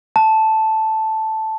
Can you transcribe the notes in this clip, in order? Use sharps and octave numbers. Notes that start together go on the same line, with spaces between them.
A5